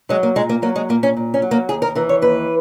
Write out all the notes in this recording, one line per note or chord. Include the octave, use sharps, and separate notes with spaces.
F#3 G#3
A#3
A#2 G#3
A#3
F#3 A#3
G#3
A#2 A#3
C#4
A#2
C#4
F#3
A#3
D#2 G#4
A#4
E3 A#4
C#5
D#2 B4